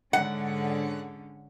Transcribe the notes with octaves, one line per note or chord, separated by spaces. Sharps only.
G#2 D3 C#4 F#5